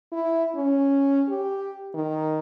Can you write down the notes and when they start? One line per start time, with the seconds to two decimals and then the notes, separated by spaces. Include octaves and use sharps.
0.12 E4
0.56 C#4
1.28 G4
1.95 D#3